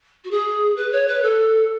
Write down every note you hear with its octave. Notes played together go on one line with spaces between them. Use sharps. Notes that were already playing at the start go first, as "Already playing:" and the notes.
F#4
G#4
B4
C#5
B4
A4